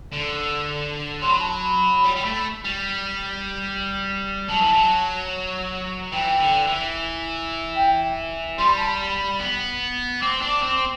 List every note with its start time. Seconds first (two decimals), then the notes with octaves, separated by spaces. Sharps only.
0.13 D3
1.22 F#3 C6
1.31 B5
1.40 A5
1.48 B5
2.04 G3
2.16 G3
2.25 A3
2.65 G3
4.49 F#3 A5
4.61 E3
4.73 F#3
6.12 E3 G5
6.39 D3
6.67 E3
7.76 G5
8.58 G3 C6
8.68 B5
8.77 A5
8.87 B5
9.40 B3
10.21 C4 D6
10.41 D4
10.62 C4